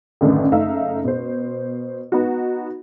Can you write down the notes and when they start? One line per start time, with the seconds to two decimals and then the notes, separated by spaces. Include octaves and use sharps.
0.21 A1 F#2 A2 D3 D#3
0.52 F#1 A3 D#4 E5 F5 E6
1.04 B2 C5
2.12 B3 D#4 F#4